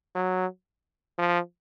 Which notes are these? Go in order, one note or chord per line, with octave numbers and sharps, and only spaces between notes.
F#3
F3